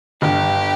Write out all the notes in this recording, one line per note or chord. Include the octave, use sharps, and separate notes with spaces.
G1 G4